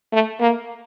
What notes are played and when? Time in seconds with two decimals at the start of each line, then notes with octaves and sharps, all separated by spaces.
0.13 A3
0.41 A#3